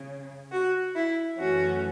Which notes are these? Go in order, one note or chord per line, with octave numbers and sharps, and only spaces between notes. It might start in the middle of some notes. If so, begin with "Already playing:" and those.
Already playing: C#3
F#4
E4
F#2 E3 A3 C#4 F#4